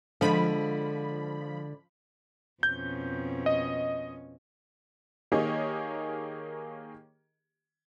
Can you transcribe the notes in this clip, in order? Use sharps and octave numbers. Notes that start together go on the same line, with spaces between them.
D3 F3 G#3 B5
F2 B2 C#4 G6
D#5
D#3 A#3 G4 G#4 C#5 D#5